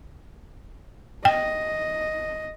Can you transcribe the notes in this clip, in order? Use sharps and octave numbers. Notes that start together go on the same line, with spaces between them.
D#5 G5